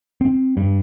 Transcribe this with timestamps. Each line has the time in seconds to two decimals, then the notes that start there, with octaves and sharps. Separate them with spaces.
0.21 C4
0.57 G2